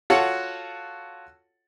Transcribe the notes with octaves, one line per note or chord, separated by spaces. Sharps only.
F4 F#4 A4 C#5 F#5